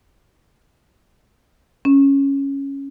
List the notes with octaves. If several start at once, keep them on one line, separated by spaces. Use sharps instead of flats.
C#4